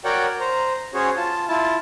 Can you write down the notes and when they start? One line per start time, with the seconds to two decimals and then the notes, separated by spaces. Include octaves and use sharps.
0.05 F#4 A#4 C#5 D5 F#5 G5
0.40 C5 A#5
0.94 C#4 F#4 G#4 C5 C#5
1.17 F4 A5
1.49 E4 F4 A5